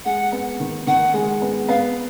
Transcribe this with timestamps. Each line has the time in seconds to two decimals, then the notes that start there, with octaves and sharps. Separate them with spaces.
0.05 G#3 F#5
0.32 B3
0.60 D#3
0.87 D#3 F#5
1.14 G#3
1.42 B3
1.69 B3 F5